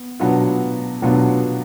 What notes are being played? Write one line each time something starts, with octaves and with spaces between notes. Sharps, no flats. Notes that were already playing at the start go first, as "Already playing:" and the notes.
Already playing: B3
B2 F#3 B3 D4 F4
B2 F#3 B3 D4 F4